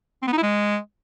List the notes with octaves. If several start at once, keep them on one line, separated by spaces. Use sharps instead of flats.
C4
B3
D#4
E4
G#3